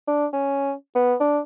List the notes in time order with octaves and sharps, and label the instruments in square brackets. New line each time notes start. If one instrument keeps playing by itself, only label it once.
[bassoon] D4
C#4
B3
D4